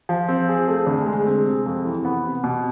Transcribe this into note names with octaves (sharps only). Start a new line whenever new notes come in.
F3
C4
G#4
A3
D2
G#3
C4
C3
F2
E3
B3
C3
B2